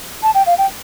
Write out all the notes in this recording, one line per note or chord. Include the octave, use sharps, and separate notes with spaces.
A5
G5
F5
G5